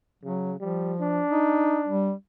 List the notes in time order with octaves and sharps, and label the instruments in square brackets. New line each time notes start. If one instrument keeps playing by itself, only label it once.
[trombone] C#3 [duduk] F#3
[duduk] F3 [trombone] G3
[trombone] D4
[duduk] D#4
G3